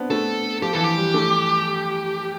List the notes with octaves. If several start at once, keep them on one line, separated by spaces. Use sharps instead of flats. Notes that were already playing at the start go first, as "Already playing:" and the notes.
Already playing: B3 C4 D4
A3 A4
F3 G4
E3 A4
F3 G4
G3
A3